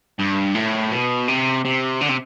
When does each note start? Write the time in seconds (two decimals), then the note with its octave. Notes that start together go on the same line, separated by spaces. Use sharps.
0.19 G2
0.55 A2
0.92 B2
1.28 C3
1.65 C3
2.01 D3
2.09 C3